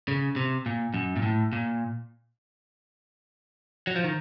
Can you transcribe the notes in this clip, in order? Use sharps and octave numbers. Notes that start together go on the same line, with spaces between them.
C#3
C3
A#2
F#2
A#2
A2
A#2
F#3
F3
D#3